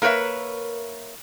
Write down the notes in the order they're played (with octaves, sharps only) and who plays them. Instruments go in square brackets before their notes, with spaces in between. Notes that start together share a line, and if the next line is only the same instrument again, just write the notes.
[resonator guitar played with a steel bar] A#3 A#4 B4 C#5 E5